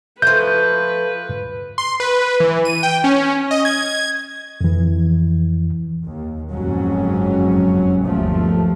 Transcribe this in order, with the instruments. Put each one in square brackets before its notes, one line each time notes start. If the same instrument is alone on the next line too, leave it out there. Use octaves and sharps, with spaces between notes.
[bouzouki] F3 A3 [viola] B4 [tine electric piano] G6
[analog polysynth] C6
B4
E3
D#7
G5
C#4
D#5
G#6
G#6
[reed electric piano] F2 E3
[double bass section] D#2
F#1 F2 G#2 F#3 C#4
G1 D#2 F3 A3